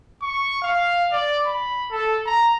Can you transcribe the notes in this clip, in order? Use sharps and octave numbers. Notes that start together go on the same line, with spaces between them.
C#6
F5
D5
B5
A4
A#5